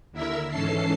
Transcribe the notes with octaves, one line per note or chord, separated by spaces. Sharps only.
D#2 D3 E4 A#4 E5 E6
G#2 E3 C#4 A4 A5 C7